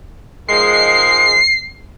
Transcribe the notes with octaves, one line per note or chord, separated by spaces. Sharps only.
D#3 F3 G#3 C7